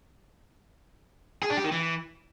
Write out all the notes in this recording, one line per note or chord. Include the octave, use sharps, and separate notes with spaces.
G#4
D4
G4
D#3
E3